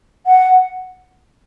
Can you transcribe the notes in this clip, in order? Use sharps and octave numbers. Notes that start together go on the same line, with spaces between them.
F#5